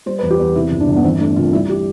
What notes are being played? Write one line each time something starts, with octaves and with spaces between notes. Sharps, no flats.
G3 C5
B4
E2
G4
E2
C3 E4
G1
D4
G1
B3
E3 C4
A3 D4
C2 F4
G3 E4
G4